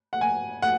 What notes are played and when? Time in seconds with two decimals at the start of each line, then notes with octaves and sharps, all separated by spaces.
0.13 F#5
0.21 G#5
0.62 F#5